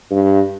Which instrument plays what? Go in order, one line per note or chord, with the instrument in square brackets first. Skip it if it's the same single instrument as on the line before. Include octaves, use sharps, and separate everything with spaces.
[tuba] G2